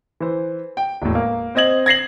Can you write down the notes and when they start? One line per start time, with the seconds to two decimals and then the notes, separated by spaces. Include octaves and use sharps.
0.20 E3 C5
0.77 G5
1.02 E1 A2
1.15 A#3
1.55 C4 C5 D#5 G#6 F#7
1.86 G#6 A#6 C7 F#7